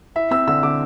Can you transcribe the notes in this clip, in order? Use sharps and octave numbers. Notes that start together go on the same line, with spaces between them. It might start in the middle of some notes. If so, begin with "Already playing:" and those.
E4 E5
C4 E6
D3 E6
D3 D6